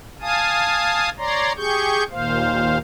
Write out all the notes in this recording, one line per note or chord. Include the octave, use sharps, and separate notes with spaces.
F5 G#5 A5 D#6
C#5 D5 A#5 C6
G4 G#4 C#6 G6
D#2 A#2 C5 F5